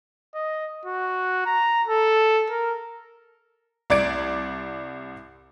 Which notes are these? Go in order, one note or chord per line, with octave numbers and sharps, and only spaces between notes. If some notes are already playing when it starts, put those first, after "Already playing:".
D#5
F#4
A#5
A4
A#4
C2 D5 D6 G#6 D7